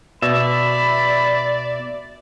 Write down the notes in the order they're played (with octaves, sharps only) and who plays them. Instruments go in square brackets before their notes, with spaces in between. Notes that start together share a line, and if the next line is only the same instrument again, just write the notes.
[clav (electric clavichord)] B2 [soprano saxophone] D5 [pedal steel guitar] E5 [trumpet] B5